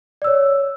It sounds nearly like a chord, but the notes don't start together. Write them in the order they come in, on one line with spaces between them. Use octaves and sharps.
D5 E6 C#5